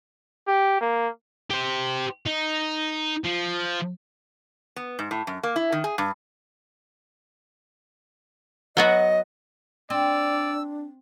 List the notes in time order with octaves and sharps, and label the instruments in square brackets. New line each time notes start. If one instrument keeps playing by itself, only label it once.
[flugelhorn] G4
A#3
[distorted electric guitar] G4 C5
D#4
F3
[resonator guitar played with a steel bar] B3
G#2
A2
F#2
A#3
E4
D#3
G#4
G2
[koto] F#3 B3 F#4 [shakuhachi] D#5
[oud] C4 [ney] D4 [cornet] D5 [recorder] E6